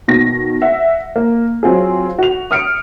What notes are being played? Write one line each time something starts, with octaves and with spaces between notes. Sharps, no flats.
B2 D#3 A#6
E5 F#5
A#3
F#3 C4 F4 G#4
F#4 F7
D#6 F6 C#7 D7